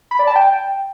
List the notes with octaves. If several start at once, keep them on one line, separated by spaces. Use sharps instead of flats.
B5
D5
A5
G5